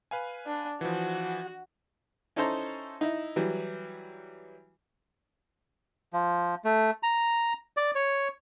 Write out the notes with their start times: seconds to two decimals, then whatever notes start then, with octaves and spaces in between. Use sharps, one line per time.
0.11 B4 F5 G#5
0.46 D4
0.81 E3 F3 F#4
2.36 C#4 D#4 E4 A4 C5 A#5
3.01 D#4 E4
3.36 E3 F#3 G3
6.13 F3
6.64 A3
7.03 A#5
7.77 D5
7.95 C#5